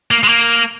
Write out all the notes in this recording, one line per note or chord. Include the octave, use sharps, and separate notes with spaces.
A#3
G#3
A#3